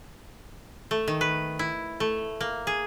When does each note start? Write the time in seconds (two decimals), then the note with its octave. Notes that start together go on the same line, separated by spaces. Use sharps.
0.91 A3
1.08 D#3
1.21 B4
1.59 E4
2.00 A3
2.41 A#3
2.67 G#4